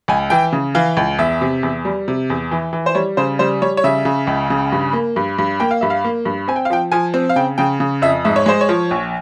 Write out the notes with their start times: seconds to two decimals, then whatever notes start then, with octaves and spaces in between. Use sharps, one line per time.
0.08 C#2 G#5
0.30 E3 G5
0.53 C#3
0.75 E3 F5
0.97 C#2
1.18 E2 E5
1.41 C3
1.63 E2
1.85 G3
2.08 C3
2.30 E2
2.51 E3
2.73 E3
2.86 C5
2.95 G3 C#5
3.17 C#3 C5
3.39 G3 C5
3.62 G3 C#5
3.77 C#5
3.84 C#3 E5
4.05 C#3
4.27 C#2
4.50 C#3
4.72 G2
4.93 A#3
5.16 G2
5.38 G2
5.60 A#3 G5
5.71 F5
5.81 G2 E5
5.90 F5
6.04 A#3
6.25 G2
6.48 C4 G#5
6.56 G5
6.65 F5
6.70 F3 G5
6.92 F3 G#5
7.14 C4
7.29 F5
7.36 C#3 G5
7.58 C#3 G5
7.80 C#3
8.02 F2 E5
8.25 G#2 E5
8.36 C#5
8.46 G#3 C5
8.61 C#5
8.69 F3
8.91 A#1